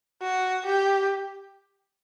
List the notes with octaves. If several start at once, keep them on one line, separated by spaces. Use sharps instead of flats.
F#4
G4